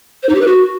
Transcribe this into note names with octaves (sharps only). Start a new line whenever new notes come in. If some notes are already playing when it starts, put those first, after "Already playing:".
C5
D#4
G4
B4
F#4